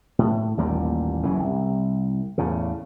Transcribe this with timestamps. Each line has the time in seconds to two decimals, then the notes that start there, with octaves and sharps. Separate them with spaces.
0.19 A2
0.58 A1 D#2 A#2 G3
1.23 F#1 F#2 C#3 E3
1.40 C2
2.38 E2 A2 C#3